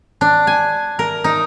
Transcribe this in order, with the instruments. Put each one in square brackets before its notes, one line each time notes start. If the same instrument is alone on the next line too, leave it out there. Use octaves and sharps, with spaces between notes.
[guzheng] D4
G#5
A#4
D#4